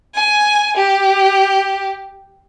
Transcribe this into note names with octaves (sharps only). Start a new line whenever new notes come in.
G#5
G4